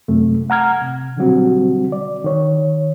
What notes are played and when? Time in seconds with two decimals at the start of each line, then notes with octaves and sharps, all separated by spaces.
0.08 F#2 C3 A3
0.50 F#5 A#5 F6 G#6
0.81 C3
1.17 B2 D3 F#3 G3 C4 F#4
1.92 D5
2.24 D#3 C#5